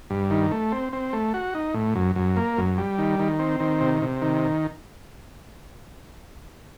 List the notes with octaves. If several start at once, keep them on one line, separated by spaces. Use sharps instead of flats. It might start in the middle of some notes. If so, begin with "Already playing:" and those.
G2
D#3
A3
C4
C4
A3
F#4
D#4
A2
F#2
F#2
A#3
F#2
G3
D#3
D#3
C4
D#3
C3
C3
D#3